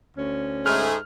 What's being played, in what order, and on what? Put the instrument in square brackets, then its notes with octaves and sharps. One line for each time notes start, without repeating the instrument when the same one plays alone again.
[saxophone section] D2 C#4
[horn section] G#2 A3 G#4 [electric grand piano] F6